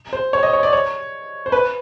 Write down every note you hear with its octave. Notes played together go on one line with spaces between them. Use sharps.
C5
C#5
D#5
C#5
D5
C#5
C5
B4